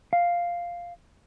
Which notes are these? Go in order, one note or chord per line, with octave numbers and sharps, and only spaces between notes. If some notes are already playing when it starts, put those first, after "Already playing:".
F5